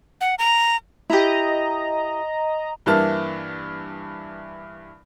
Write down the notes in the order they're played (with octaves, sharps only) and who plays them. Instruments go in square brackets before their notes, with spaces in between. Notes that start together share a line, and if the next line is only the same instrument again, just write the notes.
[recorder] F#5
A#5
[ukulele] E4 G4 [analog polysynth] D#5 A#5
[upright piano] G2 E3 A#3 E4 A5 F6